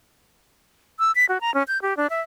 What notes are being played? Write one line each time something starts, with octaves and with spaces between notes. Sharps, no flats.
E6
B6
F#4
A#5
C#4
G6
G4
D4
E5